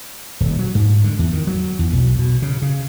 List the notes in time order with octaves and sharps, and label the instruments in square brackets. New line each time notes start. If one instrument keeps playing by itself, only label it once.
[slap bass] D#1
F#3
G#2
D3
E2
D#3
F#3
E2
B1
B2
C#3
C#3